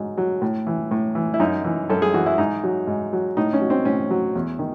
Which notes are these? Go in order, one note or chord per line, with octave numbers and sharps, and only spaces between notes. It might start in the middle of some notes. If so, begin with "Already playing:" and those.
Already playing: G#2 F#3
F#3
A2
E3
A2
E3
E4
F#2 D#4
E3
F#2 A4
G#4
E3 F#4
E4
G#2 D#4
F#3
G#2
F#3
A2 D#4
C#4
F#3
C4
A2 C#4
F#3
E2
D#3